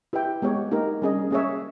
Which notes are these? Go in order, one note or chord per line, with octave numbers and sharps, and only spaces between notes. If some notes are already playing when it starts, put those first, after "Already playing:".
E4 G4 B4 E5 G5
G#3 B3 G4 C#5
A#3 D#4 G4 A#4
G3 C#4 G#4 D#5
A#3 C#4 G#4 C#5 E5